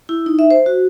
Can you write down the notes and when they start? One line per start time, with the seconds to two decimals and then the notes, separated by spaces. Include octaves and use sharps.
0.09 E4
0.26 D#4
0.39 E5
0.51 C5
0.66 F#4